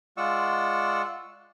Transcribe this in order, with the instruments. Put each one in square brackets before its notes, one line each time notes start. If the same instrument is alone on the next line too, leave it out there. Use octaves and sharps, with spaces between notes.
[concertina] G#3 F4 D5 F#5 C#6 E6